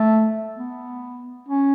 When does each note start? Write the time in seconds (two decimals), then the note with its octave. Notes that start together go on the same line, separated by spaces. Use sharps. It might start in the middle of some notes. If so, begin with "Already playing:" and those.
Already playing: A3
0.57 B3
1.48 C#4